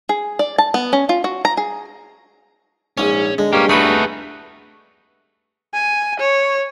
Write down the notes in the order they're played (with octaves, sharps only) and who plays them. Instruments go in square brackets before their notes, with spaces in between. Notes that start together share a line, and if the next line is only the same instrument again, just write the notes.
[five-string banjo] G#4
D5
A5
B3
C#4
F4
F#4
A#5
G#4
[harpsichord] A#1 C#5 [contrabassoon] G#2 [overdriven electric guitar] C#4
[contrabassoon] D3 [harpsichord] G#3
[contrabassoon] G2 [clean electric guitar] A#3 C#4 [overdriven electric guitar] G4
[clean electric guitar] A3 D#4 F#4 [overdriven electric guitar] G#4 B4 [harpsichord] G5 B5
[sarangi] G#5
C#5